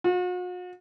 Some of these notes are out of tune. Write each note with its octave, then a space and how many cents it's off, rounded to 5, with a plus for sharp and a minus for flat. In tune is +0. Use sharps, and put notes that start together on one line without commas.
F#4 -45